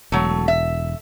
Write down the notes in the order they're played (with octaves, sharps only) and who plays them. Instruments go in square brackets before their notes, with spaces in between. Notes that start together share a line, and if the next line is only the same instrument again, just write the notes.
[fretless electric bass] E1 [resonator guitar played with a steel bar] F#3 A3
[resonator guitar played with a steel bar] E5